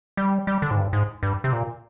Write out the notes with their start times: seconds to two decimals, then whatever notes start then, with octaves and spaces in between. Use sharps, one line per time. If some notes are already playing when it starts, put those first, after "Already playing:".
0.17 G3
0.47 G3
0.62 D3
0.71 G#2
0.77 G2
0.93 G#2
1.23 G2
1.44 C3
1.53 A#2